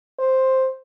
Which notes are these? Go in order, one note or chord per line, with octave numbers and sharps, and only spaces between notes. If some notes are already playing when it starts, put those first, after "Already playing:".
C5